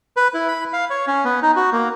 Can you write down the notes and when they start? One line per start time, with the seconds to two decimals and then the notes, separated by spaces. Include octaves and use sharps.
0.17 B4
0.34 E4
0.48 B5
0.73 F5
0.90 C#5
1.07 C#4
1.24 B3
1.43 D#4
1.56 F#4
1.72 A#3